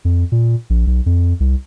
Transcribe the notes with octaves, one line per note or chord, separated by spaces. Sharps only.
F2
A#2
A#1
B1
F2
C2